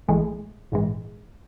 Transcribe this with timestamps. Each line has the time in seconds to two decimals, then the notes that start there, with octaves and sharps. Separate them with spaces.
0.08 A#1 A2 E3 G#3 A3
0.72 A#1 G#2 E3 G#3